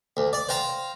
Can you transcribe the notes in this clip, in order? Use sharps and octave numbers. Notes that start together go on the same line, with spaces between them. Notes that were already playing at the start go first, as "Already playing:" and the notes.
D2
D5
C5 F5 G5 A#5